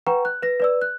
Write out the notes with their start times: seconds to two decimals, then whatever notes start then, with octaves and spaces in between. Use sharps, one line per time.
0.07 B4 F#5 G5 A#5 C#6
0.25 F#6
0.43 B4 A#6
0.60 B4 D5 E6
0.82 F#6